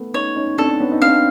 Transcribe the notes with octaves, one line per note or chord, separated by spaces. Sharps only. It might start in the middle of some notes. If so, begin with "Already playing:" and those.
Already playing: A3 B3
C#4 D#4 C#5
C#4 D#4
C4 D4 A4
B3 C#4
D#4
C4 D4 F5